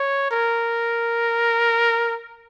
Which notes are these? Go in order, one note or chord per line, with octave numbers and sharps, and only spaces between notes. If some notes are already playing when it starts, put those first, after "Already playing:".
Already playing: C#5
A#4